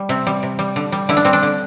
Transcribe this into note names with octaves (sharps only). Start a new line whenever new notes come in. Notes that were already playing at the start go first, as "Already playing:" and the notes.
Already playing: G3
C3 C4
G3
C3
G3
D3
G3
D3 E4
D4
G3 C4
D4
D3